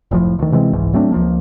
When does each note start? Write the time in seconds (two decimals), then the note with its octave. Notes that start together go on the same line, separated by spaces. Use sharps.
0.11 F1 A2 F3
0.39 D2 D#3
0.52 C3 E3 G#3 C4
0.73 F#1 C2 G#2 E3
0.93 F#3 A3 C4 D4
1.12 C#2 F3 A#3